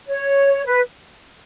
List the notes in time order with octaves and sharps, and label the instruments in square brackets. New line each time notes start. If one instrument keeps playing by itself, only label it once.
[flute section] C#5
B4